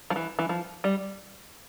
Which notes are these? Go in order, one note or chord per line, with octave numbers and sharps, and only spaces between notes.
F3
E3
E3
F3
G3